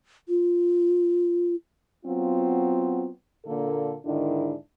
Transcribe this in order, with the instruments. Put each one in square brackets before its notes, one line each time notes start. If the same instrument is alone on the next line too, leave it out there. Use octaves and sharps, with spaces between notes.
[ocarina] F4
[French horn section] F#3 B3 C4 F4
A#2 D3 A#3 A4
G#2 D3 D#3 D4 E4